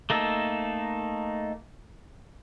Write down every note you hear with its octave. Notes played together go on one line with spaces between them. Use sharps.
A3 A#3 D#4 A4